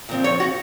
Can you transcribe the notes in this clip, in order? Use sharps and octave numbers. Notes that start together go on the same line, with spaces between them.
A#2 F3 C4
C#5
F#4